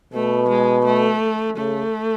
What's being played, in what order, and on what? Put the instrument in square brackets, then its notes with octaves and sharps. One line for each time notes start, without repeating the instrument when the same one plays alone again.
[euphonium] B2 [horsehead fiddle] A3
[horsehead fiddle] G#3
A3
[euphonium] C#3 [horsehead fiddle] A3